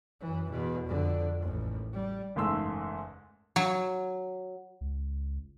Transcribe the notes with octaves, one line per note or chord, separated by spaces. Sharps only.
F#2 E3
E2 B2
F2 D3
A1 D#2
G3
F#1 E2 G#2 A3 C6 E6
F#3
C#2